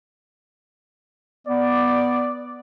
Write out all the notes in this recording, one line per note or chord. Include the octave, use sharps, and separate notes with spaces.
B3 D5